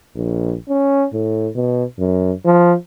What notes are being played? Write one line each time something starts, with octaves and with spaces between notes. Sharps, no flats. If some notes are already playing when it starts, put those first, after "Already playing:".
A#1
C#4
A2
B2
F#2
F3